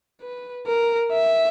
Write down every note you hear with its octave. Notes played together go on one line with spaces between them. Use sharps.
B4
A#4
E5